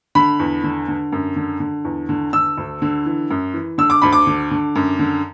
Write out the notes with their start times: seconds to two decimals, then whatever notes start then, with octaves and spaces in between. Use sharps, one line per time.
0.15 D3 B5
0.40 E2
0.64 D3
0.88 D3
1.12 F#2
1.36 D3
1.60 D3
1.85 E2
2.09 D3
2.33 D3 E6
2.58 D2
2.82 D3
3.06 E3
3.30 F#2
3.54 E3
3.78 D3 E6
3.90 D6
4.02 D2 B5
4.13 D6
4.27 D3
4.51 D3
4.75 F#2
4.99 D3